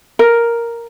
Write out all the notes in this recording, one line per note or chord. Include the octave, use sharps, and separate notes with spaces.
A#4